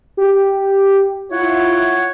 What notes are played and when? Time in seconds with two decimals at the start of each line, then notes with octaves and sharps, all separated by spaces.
0.17 G4
1.31 E4 F4 C#5 F#5